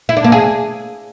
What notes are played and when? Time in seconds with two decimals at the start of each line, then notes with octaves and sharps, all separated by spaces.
0.09 E4
0.17 D4
0.24 A#3
0.32 G#4